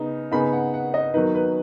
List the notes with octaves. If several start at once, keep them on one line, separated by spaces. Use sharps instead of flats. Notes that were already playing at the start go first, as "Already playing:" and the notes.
Already playing: C#3 B3 D#4
C#3 B3 D#4 B5
F#5
F#5
D#5
D#3 F#3 B3 D#4 B4
B4